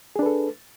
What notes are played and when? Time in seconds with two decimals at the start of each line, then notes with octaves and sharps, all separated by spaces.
0.16 G#4
0.19 D4
0.23 B4
0.26 A4